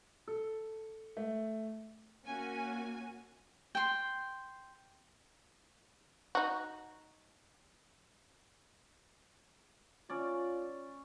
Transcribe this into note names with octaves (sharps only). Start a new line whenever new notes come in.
A4
A3
A#3 C#4 F#4 G#5
G5 C6
D#4 F#4
C#4 F4 D5